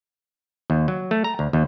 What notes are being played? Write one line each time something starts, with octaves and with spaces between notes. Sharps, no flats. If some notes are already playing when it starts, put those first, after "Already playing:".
D#2
F#3
A3
A#5
D2
D#2